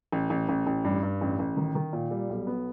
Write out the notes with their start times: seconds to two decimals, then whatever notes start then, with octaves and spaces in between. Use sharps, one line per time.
0.12 A1
0.30 A1
0.49 A1
0.67 A1
0.85 G2
1.03 G2
1.21 A1
1.39 A1
1.57 D#3
1.75 D#3
1.93 A#2
2.11 G3
2.30 B1
2.47 B3